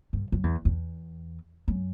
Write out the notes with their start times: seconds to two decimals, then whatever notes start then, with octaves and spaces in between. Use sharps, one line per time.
0.13 G2
0.32 F#2
0.44 E2
0.65 E2
1.68 F#2